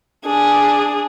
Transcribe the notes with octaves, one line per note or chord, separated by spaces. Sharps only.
D4 G#4